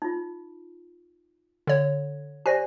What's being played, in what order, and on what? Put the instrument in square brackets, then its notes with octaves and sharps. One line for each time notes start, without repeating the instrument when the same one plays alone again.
[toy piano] D#4 F4
[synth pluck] D3 C#5
[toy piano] G4 C5 D5 [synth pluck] G#5 A#6